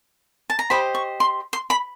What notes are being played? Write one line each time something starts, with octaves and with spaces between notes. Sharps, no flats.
A5
A#5
G4 C5 D#5 B5
C#6
C6
C6
B5